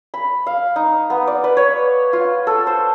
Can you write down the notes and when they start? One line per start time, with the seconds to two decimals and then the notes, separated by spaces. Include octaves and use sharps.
0.14 B5
0.46 F5
0.76 D#4
1.10 B3
1.27 D5
1.44 B4
1.57 C#5
2.13 F4
2.47 A4
2.67 C5